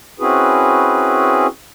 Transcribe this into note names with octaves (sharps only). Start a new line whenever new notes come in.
C4 C#4 E4 F#4 G#4 B4